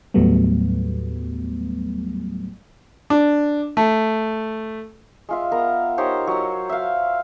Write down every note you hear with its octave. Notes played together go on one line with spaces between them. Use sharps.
D#2 A2 F#3 G3 A3 B3
D4
A3
G#3 F4 E5
B3 A#4 A#5
D#4 G4 C5 C#5
F#3 E6
E5 F5